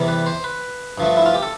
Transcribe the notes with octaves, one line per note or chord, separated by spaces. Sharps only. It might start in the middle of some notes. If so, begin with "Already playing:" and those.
Already playing: E2 C3 G3
B4
C5
B4
G2 F3 A3
E4
F4
G4
A4